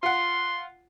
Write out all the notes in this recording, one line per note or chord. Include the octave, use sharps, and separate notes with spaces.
F4 F#5 C6